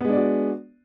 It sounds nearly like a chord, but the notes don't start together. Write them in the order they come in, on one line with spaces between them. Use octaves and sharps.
B3 G#3 D4 D5 F#4